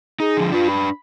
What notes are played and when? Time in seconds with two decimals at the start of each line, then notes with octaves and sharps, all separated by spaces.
0.20 D#4 G#4
0.37 D3 F3
0.52 D4 F4 B4
0.69 B5